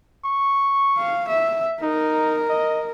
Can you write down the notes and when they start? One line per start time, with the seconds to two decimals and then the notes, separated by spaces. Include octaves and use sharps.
0.25 C#6
0.97 F5
1.28 E5
1.82 D#4 A#4
2.49 D#5